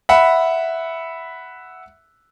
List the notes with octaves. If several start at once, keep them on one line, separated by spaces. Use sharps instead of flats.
E5 F#5 B5